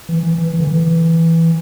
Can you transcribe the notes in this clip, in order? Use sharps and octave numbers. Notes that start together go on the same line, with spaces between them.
E3
E3
E3
E3
D3
E3